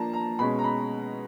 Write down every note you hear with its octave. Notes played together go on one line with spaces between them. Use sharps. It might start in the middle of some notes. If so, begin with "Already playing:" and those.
Already playing: F3 A#3 D4 A5 A#5
A#5
B2 G#3 C#4 B5
A#5
B5